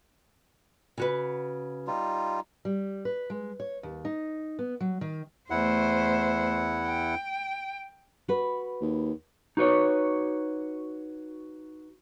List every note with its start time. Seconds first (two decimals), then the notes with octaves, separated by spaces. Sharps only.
0.98 C#3 F#4 B4
1.87 G3 D#4 F4
2.65 G3
3.05 B4
3.30 G#3
3.60 C#5
3.83 D#2
4.05 D#4
4.59 B3
4.80 F#3
5.01 D#3
5.50 E2 A3 E4 C5 F#5
6.87 G5
8.28 F#4 B4
8.81 D#2
9.57 D#4 F#4 B4 C#5